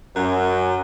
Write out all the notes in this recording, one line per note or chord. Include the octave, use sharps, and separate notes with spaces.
F#2